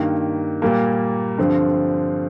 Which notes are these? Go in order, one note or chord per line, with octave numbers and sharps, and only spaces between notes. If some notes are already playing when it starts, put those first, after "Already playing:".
Already playing: G2 D#3 A#3
A#2 G3 A#3
G2 D3 F3 C4